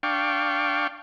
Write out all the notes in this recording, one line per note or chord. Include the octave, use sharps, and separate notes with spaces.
D4 F5 G5 C#6